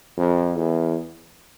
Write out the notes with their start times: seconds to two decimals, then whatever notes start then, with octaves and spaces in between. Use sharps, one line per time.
0.17 F2
0.56 E2